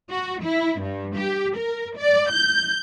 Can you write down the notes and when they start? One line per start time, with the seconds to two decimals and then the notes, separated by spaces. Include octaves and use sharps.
0.10 F#4
0.43 E4
0.81 G2
1.18 G4
1.57 A#4
1.98 D5
2.31 G6